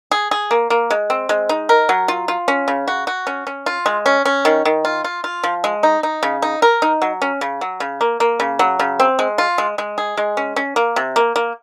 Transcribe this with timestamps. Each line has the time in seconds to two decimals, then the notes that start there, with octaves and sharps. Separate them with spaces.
0.11 G#4
0.31 G#4
0.51 A#3
0.70 A#3
0.90 G#3
1.10 C4
1.29 G#3
1.49 D#4
1.69 A#4
1.89 F#3
2.08 F4
2.28 F4
2.48 C#4
2.68 C#3
2.87 F#4
3.07 F#4
3.27 C#4
3.47 C#4
3.66 F4
3.86 G#3
4.06 C#4
4.25 C#4
4.45 D#3
4.65 D#3
4.85 F4
5.04 F4
5.24 F4
5.43 F3
5.64 G#3
5.83 D#4
6.03 D#4
6.23 C#3
6.42 D#4
6.62 A#4
6.82 D#4
7.02 F#3
7.22 C#4
7.41 C#3
7.61 F#3
7.80 C#3
8.01 A#3
8.20 A#3
8.40 C#3
8.59 F#3
8.79 C#3
8.99 C4
9.19 G#3
9.38 F4
9.58 G#3
9.78 G#3
9.98 G#4
10.17 G#3
10.37 C#4
10.56 C#4
10.76 A#3
10.96 C3
11.16 A#3
11.36 A#3